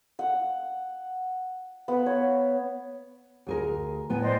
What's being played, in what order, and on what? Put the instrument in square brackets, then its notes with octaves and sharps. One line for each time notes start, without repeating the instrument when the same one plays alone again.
[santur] F#5
B3
C#5
[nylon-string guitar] D2 G#4 A#4
[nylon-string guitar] A2 B3 [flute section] G#5
[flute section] C5 D5 D#5